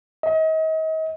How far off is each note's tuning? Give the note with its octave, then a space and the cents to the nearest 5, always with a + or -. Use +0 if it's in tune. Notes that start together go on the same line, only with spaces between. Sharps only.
D#5 +35